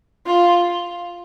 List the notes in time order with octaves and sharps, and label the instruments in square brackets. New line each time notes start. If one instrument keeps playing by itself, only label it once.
[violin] F4